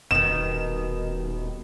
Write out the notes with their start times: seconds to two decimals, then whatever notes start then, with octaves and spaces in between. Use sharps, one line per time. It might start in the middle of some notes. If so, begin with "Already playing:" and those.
0.11 D#1 B2 D#3 E7